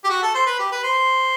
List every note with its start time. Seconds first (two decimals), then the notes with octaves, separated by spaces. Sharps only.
0.04 G4
0.10 F#4
0.23 A4
0.35 C5
0.46 B4
0.59 G4
0.72 B4
0.84 C5